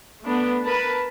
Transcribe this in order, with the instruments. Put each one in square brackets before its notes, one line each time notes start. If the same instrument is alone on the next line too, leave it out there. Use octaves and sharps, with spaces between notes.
[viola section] A3 B3 D4
A#4 B4 A5 B5